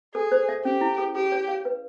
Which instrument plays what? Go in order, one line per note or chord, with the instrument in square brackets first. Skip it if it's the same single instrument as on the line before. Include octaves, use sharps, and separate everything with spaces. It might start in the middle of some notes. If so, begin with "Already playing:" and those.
[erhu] G#4 [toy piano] A4
[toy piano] C5
E5
[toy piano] C#4 [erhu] G4
[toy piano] E4
G#4
[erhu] G4 [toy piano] G#4
[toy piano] C#5
F5
B4